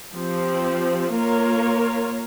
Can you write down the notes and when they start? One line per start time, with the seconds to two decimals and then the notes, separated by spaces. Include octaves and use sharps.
0.15 F3 C4 G4
1.13 A#3 F4 A#4 C#5